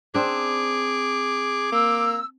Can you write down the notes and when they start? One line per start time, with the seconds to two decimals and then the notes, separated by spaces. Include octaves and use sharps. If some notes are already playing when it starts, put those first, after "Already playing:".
0.15 C4 D4 G#4 D6
1.72 A#3 E6